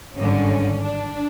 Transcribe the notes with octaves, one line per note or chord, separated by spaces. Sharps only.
G#1 G2 D3 C#4
D4